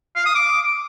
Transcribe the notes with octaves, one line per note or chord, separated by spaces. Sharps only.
F5
D#6
D6